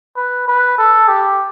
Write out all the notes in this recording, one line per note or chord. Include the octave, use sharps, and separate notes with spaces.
B4
B4
A4
G4